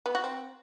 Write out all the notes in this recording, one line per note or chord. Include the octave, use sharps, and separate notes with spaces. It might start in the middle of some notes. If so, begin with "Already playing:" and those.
B3
F#4
C4